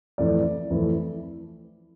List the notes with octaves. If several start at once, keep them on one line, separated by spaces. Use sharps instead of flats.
F2 E3 A3 E4 D5
F2 E3 A3 E4